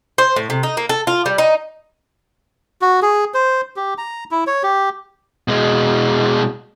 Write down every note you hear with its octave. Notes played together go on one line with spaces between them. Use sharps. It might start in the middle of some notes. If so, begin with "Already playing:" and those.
C5
A2
C3
D#4
A#3
A4
F4
G3
D#4
F#4
G#4
C5
G4
A#5
E4
C#5
G4
B2 G#3